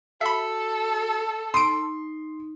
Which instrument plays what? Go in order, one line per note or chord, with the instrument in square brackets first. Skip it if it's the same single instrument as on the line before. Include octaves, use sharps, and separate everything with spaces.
[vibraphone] F#4 [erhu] A4 [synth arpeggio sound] E5 B5
[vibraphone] D#4 [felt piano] C6 [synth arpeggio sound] D#6 D7